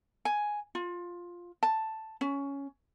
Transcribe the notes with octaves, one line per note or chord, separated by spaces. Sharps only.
G#5
F4
A5
C#4